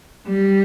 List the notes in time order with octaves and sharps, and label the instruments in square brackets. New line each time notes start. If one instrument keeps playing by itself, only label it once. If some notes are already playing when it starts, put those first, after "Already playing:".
[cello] G3